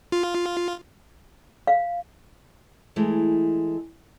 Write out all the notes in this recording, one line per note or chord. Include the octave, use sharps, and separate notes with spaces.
F4
F5
E3 G#3 A3 E4